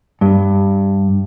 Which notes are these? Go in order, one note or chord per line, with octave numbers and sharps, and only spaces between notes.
G2